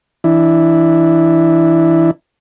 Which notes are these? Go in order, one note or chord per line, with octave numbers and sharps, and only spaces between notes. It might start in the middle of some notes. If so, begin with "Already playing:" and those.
E3 D4 E4